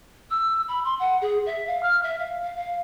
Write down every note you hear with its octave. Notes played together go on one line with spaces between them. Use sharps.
E6
B5
C6
F#5
G#4
E5
F5
F6
E5
F5
F5
F5